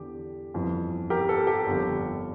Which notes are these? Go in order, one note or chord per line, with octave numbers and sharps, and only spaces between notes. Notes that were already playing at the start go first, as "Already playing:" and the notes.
Already playing: E2 D3 G4
G1 F2 E3
G4 A#4
A4
G4
G1 F2 D3